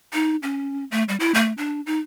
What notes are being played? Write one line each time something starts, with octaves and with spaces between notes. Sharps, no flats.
D#4
C#4
A3
G3
E4
A3
D4
D#4